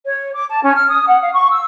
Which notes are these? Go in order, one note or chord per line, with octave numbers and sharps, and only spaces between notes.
C#5
D6
A5
C#4
F6
D#6
F#5
F5
C#6
E6